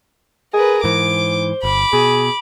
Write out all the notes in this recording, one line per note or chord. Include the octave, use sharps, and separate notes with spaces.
G#4 A#4 B4
G#2 E3 C5 D6
G1 B5 D6
B2 G#4